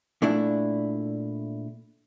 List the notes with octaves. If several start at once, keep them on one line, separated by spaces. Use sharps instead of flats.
A#2 A3 D4 E4